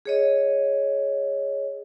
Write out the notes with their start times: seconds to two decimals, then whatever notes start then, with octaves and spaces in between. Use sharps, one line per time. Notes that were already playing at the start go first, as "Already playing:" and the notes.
0.06 G#4 C#5 D#5